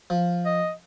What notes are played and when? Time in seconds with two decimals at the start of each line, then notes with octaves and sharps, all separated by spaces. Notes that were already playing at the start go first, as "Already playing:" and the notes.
0.10 F3
0.46 D#5